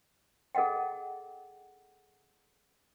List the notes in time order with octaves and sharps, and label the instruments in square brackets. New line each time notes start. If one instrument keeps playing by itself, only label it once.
[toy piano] G#4 A4 D#5 F#5 G5